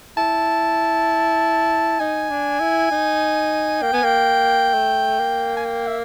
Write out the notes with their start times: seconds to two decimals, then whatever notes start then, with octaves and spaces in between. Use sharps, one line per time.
0.17 E4 A5
1.99 D#4 G#5
2.30 D4
2.60 E4
2.91 D#4
3.82 A#3 G5
3.93 B3 G#5
4.03 A#3 G5
4.74 A3
5.19 A#3
5.57 G#5
5.65 G5
5.87 E5